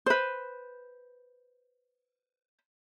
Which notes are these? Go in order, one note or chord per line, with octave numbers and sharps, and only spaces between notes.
B4 C5